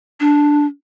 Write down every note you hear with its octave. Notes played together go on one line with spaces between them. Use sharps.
D4